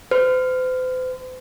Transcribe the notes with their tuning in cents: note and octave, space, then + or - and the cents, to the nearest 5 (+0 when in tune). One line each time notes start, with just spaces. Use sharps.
C5 -45